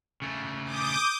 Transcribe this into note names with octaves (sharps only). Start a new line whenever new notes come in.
C#3 A3
D6 D#6 G6